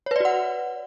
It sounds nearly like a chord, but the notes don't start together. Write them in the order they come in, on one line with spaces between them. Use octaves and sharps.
C#5 B4 D5 F#4 F#5